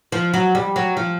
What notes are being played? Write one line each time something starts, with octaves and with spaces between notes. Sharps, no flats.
F3
F#3
G3
F#3
F3